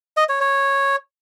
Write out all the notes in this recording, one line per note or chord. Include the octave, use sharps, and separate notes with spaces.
D#5
C#5
C#5